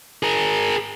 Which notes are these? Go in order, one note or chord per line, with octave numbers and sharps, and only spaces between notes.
G#4 A#4